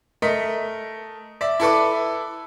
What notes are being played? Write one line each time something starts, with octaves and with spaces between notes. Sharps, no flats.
A3 A#4 D#5 B6
D5 E5
E4 A4 B4 D6